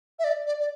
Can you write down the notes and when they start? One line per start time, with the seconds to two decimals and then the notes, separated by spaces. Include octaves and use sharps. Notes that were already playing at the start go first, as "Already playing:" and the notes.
0.19 E5
0.24 D5
0.46 D5
0.60 D5